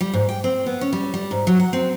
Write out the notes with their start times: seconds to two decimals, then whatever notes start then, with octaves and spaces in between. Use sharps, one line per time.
0.01 G3
0.14 G#2
0.29 G5
0.44 C4
0.66 B3
0.81 C#4
0.93 G3
1.14 G3
1.31 G#2
1.47 F#3
1.60 F#5
1.73 C4